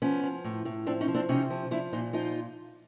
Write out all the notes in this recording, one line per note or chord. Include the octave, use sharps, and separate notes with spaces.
F3 B3 C#4
F3
A2
A2
F3 C4 D4
C#4 D#4
F3
C4 D4
C3 C#4 D#4
F3
F3 D4 E4
A#2 D#4 F4
F3 D#4 F4